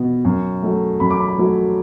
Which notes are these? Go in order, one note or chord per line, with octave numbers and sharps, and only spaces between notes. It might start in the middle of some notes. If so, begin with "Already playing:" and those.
Already playing: B2 B3
F#2
F#3 A3
F#2 B5
D6
B5
F#3 A3